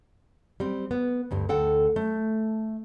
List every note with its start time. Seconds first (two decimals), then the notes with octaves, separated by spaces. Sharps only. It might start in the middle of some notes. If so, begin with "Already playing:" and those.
0.60 G3 C4
0.91 B3
1.31 D2 G2 G3
1.49 D2 A4 F#5 G5
1.96 A3